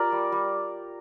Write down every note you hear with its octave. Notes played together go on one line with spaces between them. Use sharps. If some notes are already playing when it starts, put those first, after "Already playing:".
Already playing: F4 G4 A#4 D5
G3
G3